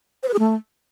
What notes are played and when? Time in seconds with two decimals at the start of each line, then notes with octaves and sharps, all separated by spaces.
0.23 C5
0.28 B4
0.34 G#4
0.39 A3